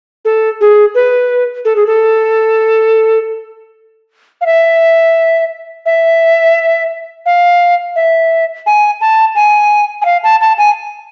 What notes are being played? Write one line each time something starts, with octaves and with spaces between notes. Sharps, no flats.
A4
G#4
B4
A4
G#4
A4
F5
E5
E5
F5
E5
G#5
A5
G#5
G#5
F5
A5
A5
G#5